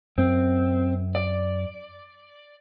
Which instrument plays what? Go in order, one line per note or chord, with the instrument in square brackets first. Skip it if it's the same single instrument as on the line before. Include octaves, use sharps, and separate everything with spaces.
[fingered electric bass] F#2 [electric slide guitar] C4
[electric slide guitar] D5